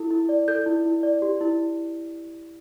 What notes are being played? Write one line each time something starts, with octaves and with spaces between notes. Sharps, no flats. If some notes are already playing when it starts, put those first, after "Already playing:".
Already playing: E4 A4
E4
D5
A4 G6
E4
E4
D5
G4
E4